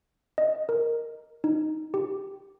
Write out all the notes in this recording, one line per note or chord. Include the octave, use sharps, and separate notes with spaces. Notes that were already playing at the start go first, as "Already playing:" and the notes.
D#5
A#4
D#4
G4